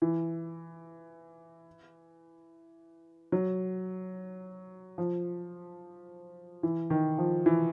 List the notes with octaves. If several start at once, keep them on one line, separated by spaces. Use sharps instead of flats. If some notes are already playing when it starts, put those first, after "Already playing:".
E3
F#3
F3
E3
D#3
F3
E3